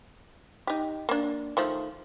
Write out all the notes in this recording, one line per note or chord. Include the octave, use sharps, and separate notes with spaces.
D#4 G4
A#3 D4
D#3 F3 A3